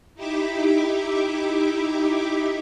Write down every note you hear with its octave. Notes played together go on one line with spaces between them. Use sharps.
D#4 E4 G4 E5 D6